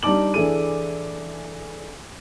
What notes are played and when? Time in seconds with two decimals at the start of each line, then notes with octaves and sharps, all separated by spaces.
0.03 G3 D4 D#4 A5 D6 F#7
0.34 E3 D4 E4 G#4 A4 D#7